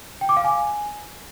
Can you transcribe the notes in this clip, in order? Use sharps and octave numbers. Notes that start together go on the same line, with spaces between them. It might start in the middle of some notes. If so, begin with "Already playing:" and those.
G5
D6
F5
G#5